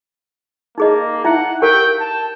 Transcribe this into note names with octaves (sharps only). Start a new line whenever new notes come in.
A#3 D#4 G#4 D#5
D#4 E4 E5 F#5
G4 A#4 F5 G5
A5